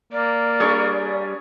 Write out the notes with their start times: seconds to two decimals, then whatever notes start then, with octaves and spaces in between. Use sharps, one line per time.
0.12 A#3 D5
0.60 G3 D4 G#4 B4 C#5 C#6